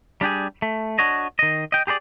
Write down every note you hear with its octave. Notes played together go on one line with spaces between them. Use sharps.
G3 D4 G4 G#4
A3
D4 F#4 C#5 D#5
D#3 D#5
D#5 G5
G4 G#4 B4 D5